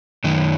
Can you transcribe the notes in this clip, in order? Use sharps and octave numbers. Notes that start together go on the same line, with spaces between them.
F#2 D#3